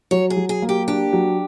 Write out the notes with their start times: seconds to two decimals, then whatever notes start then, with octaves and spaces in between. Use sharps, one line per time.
0.11 F#3 C#5
0.30 G#4
0.37 F#3
0.49 G#4
0.62 A#3
0.69 G4
0.88 D4 G4
1.13 F#3